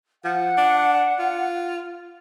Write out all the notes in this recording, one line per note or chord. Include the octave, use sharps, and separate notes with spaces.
F3 F#5
D4
F4